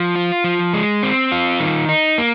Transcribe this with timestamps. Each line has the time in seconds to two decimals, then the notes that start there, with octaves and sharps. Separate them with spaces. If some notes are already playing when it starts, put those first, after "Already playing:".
Already playing: F3
0.15 F4
0.44 F3
0.74 G#3
1.03 C4
1.32 F4
1.60 D#3
1.89 D#4
2.18 A#3